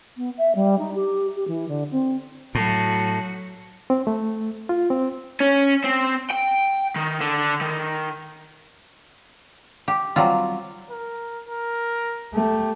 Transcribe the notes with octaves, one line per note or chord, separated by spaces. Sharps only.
B3
E5
G3
D#4
G4
G4
E3
D3
C4
A2 F#3 F#4
C4
A3
F4
C4
C#4
C4
G5
D#3
D3
D#3
G4
F#3 G3 C4 F4
A#4
A#4
A3 G4